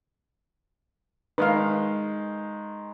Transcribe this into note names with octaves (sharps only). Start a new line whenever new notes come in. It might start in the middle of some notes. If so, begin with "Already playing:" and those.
D#3 G#3 B4 D#5 F5